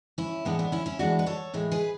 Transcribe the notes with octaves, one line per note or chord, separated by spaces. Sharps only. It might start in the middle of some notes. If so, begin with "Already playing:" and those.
C#4 E4
A2 E3 G#3 B3 D4
B3 D4
C#4 E4
C#4 E4
A2 E3 G#3 D4 F#4
B4
A4 C#5
A2 E3 G#3
G#4 B4